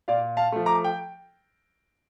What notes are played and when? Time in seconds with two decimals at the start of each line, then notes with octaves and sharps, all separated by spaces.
0.08 A#2 D5 F5
0.37 F5 A5
0.52 F3 A3
0.66 A#5 D6
0.84 G5